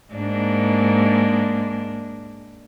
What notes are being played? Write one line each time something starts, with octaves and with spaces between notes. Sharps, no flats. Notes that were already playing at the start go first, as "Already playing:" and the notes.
G#2 A#3 D4